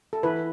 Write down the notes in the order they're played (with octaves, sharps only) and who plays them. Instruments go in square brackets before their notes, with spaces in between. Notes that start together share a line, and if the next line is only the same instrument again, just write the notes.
[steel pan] A4
[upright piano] E3 [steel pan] B4